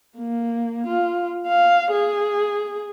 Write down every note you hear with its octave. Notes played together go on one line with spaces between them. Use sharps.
A#3
F4
F5
G#4